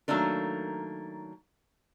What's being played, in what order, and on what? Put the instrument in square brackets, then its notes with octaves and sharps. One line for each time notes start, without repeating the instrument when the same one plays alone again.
[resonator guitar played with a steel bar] D#3 F#3 A3 A#3 D4 A#4